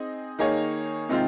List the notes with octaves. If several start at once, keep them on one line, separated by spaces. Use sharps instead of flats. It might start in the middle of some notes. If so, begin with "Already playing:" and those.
Already playing: C4 D#4 G#4 D#5
D#3 A#3 D#4 G#4 C#5
C3 D#3 G#3 C4 F4